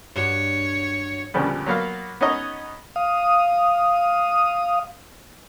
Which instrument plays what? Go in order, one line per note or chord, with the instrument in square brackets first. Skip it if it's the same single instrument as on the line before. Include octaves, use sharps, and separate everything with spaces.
[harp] G2 F#4 [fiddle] C#5
[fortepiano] D2 A#2 C#3 F3 G3 B3
F#3 A#3 B3 F5
B3 C#4 D#4 C#5 D#5 A#5
[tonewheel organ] F5 D#6